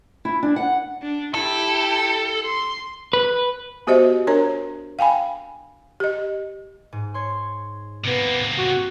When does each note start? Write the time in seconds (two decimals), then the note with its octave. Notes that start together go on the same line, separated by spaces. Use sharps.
0.25 E4
0.43 D4
0.56 F#5
1.02 D4
1.34 E4 G4 A4
2.45 C6
3.13 B4
3.87 B3 F#4 G4 C5 D#5 E5
4.27 D4 A#4 C#5 A#5
4.99 F5 G5 G#5 B5
6.00 G4 D#5
6.92 G#2
7.14 C#5 C6
8.04 C3 A#3 B3
8.58 F#4